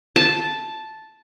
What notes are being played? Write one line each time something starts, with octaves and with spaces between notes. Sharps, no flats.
A5